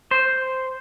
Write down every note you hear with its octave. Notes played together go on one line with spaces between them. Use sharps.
C5